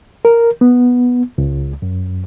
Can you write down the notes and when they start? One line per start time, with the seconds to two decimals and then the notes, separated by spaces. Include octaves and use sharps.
0.25 A#4
0.61 B3
1.38 C#2
1.82 F#2